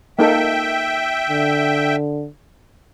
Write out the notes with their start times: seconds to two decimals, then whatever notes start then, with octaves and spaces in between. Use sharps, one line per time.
0.19 A#3 D#4 A4 E5 G5
1.29 D3